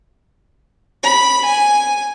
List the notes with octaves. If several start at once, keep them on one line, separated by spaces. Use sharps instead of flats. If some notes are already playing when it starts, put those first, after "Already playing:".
B5
G#5